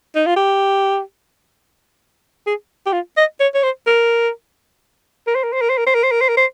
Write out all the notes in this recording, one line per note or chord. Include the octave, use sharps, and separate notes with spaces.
D#4
F4
G4
G#4
G4
F4
D#5
C#5
C#5
C5
A#4
A#4
C5
A#4
C5
A#4
C5
A#4
C5
A#4
C5
A#4
C5
A#4
C5